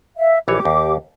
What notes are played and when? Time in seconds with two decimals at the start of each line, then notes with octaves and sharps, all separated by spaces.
0.17 E5 F5
0.48 A#1 E3 G4 C#5 D6
0.65 D#2